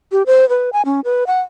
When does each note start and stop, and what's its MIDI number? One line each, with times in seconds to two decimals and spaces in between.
0.12 0.23 67
0.26 0.48 72
0.49 0.70 71
0.73 0.82 80
0.85 1.00 61
1.05 1.27 71
1.27 1.41 78